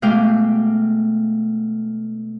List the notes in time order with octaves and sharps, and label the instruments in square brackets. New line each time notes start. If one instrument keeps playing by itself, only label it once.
[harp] B2 G#3 A3 F5 G5 D6